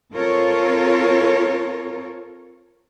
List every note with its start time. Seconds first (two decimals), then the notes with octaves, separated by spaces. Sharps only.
0.14 C4 F4 A4 A#4 C#5